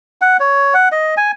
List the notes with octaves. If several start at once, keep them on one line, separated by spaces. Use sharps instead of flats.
F#5
C#5
F#5
D#5
G#5